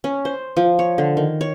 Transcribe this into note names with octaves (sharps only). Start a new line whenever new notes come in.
C#4
C5
F3
C#5
D3
D#3
C#5